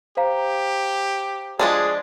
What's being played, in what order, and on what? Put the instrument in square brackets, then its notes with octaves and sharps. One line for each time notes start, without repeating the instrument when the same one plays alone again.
[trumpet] G4 [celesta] C5 F5 A#5
[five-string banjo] F3 G#3 D4 [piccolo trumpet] G#4